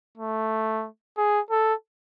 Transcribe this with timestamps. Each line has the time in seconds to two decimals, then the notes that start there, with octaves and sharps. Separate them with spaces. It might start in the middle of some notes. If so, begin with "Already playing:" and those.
0.18 A3
1.17 G#4
1.50 A4